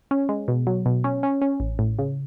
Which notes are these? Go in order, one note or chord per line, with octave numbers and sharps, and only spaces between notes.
C#4
G#3
B2
F#3
B2
C#4
C#4
C#4
A1
A2
C#3